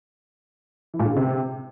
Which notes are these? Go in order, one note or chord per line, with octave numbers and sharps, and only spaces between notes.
E3
A#2
D3
C#3
C3